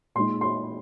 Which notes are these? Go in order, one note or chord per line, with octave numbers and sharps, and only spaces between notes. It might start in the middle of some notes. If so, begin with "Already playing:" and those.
A#2 G#3 D#4 C6
C6